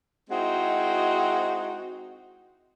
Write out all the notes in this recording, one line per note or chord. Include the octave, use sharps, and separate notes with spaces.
G#3 C4 D#4 E4 F#4